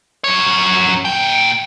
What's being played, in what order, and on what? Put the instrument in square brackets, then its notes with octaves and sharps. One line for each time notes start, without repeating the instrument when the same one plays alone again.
[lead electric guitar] F#2 C#5
A#2 G5